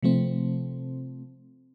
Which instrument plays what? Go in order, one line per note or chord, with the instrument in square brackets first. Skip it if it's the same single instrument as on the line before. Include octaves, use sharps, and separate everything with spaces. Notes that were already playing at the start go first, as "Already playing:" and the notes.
[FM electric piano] C3 F3 A3 C4